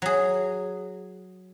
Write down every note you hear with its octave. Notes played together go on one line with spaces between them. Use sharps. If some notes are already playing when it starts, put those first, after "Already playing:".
F#3 G#4